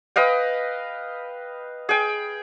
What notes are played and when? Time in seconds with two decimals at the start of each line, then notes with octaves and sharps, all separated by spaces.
0.16 B4 D#5 F5 G5
1.89 G#4 G5